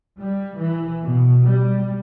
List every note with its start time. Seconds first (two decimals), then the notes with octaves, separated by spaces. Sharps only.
0.21 G3
0.60 E3
1.02 B2
1.46 G3